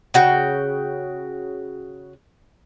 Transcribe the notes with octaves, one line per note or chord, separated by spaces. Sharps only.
C#3 F#4 G5